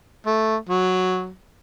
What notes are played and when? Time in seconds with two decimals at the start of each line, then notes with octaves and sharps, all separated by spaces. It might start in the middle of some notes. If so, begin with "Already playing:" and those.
0.26 A3
0.69 F#3